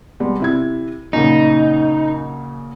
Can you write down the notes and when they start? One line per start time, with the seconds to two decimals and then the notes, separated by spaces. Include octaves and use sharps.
0.20 B2 G3 G#3
0.40 C3 E4 G#6
1.13 F#2 A#2 C#3 D#4